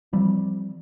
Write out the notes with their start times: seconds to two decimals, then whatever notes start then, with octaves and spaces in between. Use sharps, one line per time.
0.13 E3 F3 G3 C4